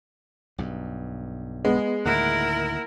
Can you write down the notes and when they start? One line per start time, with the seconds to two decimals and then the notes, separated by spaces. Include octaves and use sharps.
0.58 B1 G2
1.65 G#3 B3
2.05 D2 A2 D#3 A#3 E4 A#4 F#5 F#6